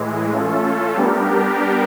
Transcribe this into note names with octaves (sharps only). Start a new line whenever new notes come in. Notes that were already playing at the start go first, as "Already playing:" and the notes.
Already playing: A2 E3 G#3
A3 C#4 F4 A4
G3 B3 D4 G4 A#4